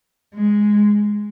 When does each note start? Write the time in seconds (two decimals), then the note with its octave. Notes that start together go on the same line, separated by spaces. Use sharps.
0.34 G#3